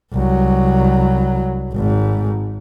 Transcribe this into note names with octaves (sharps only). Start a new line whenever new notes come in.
C2 F#3
G#1 G#2